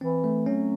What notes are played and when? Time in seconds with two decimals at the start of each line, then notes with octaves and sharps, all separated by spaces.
0.01 E3 C4
0.24 A3
0.46 F#3 C#4